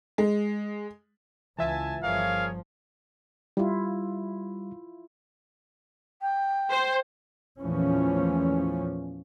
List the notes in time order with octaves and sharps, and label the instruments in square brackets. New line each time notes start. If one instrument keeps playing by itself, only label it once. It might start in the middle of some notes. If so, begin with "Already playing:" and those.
[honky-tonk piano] G#3
[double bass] C#2 [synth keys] E3 F4 E5 [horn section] G#5 A5
[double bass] G1 F3 [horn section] G#4 A#4 C#5 [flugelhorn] F5
[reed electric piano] G3 [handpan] E4 F4
[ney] G5
[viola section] C5
[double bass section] E2 A#2 E3 F3 A3 C#4